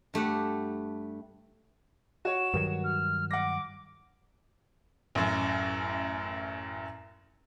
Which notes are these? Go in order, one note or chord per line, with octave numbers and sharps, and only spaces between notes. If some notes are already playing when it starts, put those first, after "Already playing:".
G2 A3 G4 F#5
F#4 C#5 E7
G2 D#3 F#3
F6
F#5 D6 A#6
A1 F#2